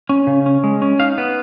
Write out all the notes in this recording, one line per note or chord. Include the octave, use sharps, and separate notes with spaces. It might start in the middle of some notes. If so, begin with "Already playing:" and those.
C#4
C#3
C#4
G#3
C#4
D#4 F5
B3